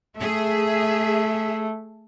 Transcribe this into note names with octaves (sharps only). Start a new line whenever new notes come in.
A3 G#4 E5